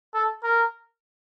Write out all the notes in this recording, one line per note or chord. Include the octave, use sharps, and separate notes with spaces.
A4
A#4